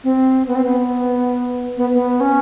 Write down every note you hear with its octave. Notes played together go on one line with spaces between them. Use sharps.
C4
B3
C4
B3
B3
B3
C#4